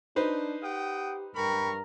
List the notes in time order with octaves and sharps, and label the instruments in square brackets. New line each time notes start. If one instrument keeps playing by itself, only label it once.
[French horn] D4 [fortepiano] D#4 B4 C5
[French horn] G4 [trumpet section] F#5 G5 D#6
[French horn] G2 [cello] A#4 [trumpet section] G5 B5 C#6